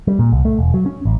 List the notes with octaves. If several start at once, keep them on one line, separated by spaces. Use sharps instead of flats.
G3
A#2
C2
A3
E1
F#3
C#4
A1